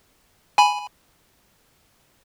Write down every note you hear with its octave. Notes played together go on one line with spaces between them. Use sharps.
G#5 B5